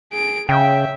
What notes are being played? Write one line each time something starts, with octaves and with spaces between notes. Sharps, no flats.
G#4 D7
C#3 E5 G5